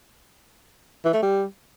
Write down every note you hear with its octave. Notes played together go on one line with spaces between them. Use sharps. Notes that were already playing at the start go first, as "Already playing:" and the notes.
E3
A3
G3